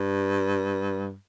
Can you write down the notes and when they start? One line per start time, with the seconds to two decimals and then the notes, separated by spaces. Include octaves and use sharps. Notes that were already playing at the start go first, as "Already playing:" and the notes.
Already playing: G2